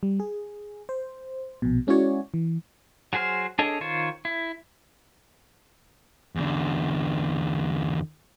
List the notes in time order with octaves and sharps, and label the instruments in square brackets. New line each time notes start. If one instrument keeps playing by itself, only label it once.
[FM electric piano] G3
G#4
C5
A#1 B2
G#3 C#4 E4 F#4 C#5 D5
E3
[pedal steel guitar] F#3 F#4 G#4 C5 F6
D4 G#4 A4 C#5 D#5
D#3 F4 C5 C#5
E4
[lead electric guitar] E2 D3